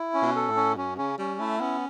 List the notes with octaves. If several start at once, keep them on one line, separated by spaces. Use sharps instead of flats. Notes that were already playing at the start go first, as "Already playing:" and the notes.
Already playing: E4
C#4
B2
A4
A2
C#4
F#2 C#4
C#3 C#4
G3 C#4
A3 E4
B3 C#4